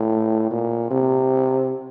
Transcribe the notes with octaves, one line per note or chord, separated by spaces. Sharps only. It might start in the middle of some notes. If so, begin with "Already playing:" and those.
Already playing: A2
A#2
C3